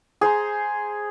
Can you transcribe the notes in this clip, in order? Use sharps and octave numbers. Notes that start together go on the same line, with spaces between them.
G#4 C5 A#5